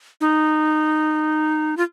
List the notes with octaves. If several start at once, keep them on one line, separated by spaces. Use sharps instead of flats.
D#4
F4